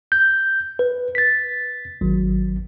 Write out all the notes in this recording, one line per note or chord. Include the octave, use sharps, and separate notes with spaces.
G6
B4
A6 B6
G#1 F#3